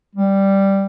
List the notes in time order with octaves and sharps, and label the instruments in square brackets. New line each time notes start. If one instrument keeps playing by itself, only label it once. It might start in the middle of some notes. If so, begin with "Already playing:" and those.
[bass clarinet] G3